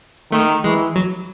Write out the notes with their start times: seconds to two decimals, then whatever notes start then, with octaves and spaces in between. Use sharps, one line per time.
0.32 D#3 A3
0.64 E3 G#3
0.96 F#3